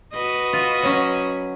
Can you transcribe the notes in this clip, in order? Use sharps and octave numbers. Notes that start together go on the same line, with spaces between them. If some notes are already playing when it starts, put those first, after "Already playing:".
F#4 B4 D#5
F4
F#3 C#4